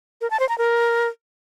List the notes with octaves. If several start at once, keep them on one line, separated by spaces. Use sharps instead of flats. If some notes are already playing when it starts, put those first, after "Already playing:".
A#4
A5
C5
A#5
A#4